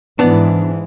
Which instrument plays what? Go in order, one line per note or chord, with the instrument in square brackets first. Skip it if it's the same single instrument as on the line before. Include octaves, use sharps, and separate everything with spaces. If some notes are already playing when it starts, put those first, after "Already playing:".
[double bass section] G#2 E3 [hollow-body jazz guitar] B3 D4